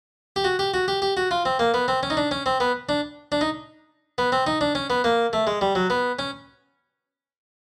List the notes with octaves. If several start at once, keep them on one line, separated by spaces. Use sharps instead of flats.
G4
F#4
G4
F#4
G4
G4
F#4
F4
C4
A#3
B3
C4
C#4
D#4
D4
C#4
C4
B3
D4
D4
D#4
B3
C4
D#4
D4
C#4
B3
A#3
A3
G#3
G3
F#3
B3
C#4